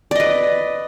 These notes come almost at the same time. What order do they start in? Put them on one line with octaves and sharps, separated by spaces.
D5 D#5 B4